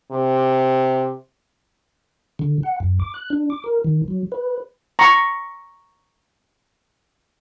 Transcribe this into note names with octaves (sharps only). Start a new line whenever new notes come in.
C3
D3
F#5
F#2
D6
F#6
D4
D6
A#4
D#3
F#3
B4
A#5 C#6